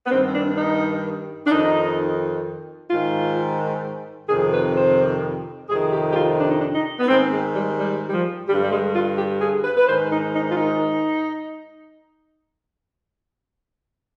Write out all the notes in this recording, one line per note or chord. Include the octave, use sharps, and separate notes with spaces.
B3
G2 D#3 C4
C4
D4
D#4
D4
F2 D#3 D#4
G#2 D#3 F4
F2 C3 D#3 G#4
B4
C5
F2 C3 D#3 G#4
G4
G4
F4
D4
D#4
D4
D#4
B3
G#2 D#3 C4
G#3
G3
G3
G3
F3
G2 D3 G3
G3
G#3
F4
G4
G#4
B4
B4
G#2 D#3 C5
D#4
D#4
F4
D#4